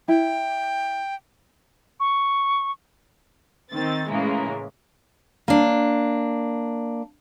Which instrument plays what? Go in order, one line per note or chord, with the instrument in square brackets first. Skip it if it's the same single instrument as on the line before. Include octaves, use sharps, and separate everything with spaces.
[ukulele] E4 [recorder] G5
[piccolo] C#6
[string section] D#3 C4 A6
A2 C#3 E3 G#3 A#3
[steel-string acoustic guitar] A#3 D4